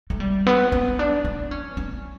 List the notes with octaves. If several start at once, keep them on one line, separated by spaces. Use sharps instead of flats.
A3
G3
B3
C#4
D4
D4
C#4
C#4